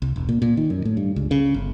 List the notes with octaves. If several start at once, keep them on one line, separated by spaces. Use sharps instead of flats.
C2
E1
A#2
A#2
D#3
F#2
A2
G2
C#2
C#3
G1